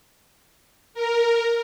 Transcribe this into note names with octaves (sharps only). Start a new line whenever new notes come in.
A#4